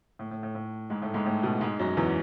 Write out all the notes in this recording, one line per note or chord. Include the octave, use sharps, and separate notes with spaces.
A2
A2
A2
A2
G#2 G#3
A2 A3
G#2 G#3
A2 A3
B2 B3
G#2 G#3
F#2 F#3
E2 E3